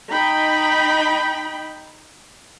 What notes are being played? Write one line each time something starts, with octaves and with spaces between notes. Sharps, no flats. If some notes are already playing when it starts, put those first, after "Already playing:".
D#4 G5 B5